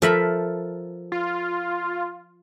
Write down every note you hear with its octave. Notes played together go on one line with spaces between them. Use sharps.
F3 A4 A#4 E5 B5
F4